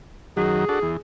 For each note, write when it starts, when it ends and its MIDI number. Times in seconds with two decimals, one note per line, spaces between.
0.37 0.65 42
0.37 0.65 51
0.37 0.65 54
0.37 0.99 68
0.69 0.79 62
0.69 0.79 66
0.69 0.79 69
0.82 0.97 40